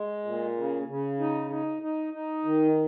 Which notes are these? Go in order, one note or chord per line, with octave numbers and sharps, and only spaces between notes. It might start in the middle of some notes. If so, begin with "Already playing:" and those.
Already playing: G#3
A#2
C#3
C#3
D#4
D#4
D#4
D#4
D#3